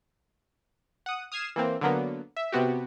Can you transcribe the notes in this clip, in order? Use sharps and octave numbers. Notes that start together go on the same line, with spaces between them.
F#5 D#6
D#6 F6 G#6 C7 E7
E3 A#3 C4
D3 F#3 A#3 B3
E5
C3 B3 F#4 G4